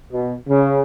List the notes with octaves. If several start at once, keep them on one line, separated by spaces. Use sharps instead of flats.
B2
C#3